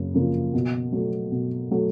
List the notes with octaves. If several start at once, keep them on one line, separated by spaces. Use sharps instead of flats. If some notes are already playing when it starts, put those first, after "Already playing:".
Already playing: F#2 C#3 A#3
C#3 F3 A#3
B2
F#3 A3
B2
F#3 A3